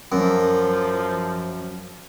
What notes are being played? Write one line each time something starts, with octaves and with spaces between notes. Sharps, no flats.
F#2 F3